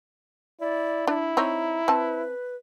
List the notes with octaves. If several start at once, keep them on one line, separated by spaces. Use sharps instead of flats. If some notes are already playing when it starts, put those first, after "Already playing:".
E4 D5
D4 E4
C4 D#4 C#5 A#5
C4 B4 A5